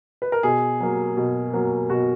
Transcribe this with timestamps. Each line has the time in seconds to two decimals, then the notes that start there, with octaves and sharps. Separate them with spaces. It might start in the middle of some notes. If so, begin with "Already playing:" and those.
0.22 B4
0.32 A#4
0.43 B2 G#4
0.80 F#3 A#3
1.17 B2
1.54 F#3 A#3
1.90 B2 F#4